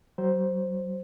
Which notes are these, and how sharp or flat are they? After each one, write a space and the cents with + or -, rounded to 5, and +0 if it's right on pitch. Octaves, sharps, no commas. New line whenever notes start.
F#3 +35 C5 +0